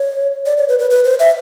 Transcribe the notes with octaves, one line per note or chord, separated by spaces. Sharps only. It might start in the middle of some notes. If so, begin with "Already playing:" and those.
Already playing: C#5
D5
C#5
B4
B4
B4
C5
E5